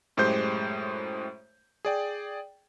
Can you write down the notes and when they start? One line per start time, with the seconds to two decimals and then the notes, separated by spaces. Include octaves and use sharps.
0.17 F#2 A2 G#3 G4 C5 G6
1.85 G#4 D5 G5